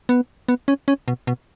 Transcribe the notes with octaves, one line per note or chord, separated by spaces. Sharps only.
B3
B3
C#4
C#4
B2
B2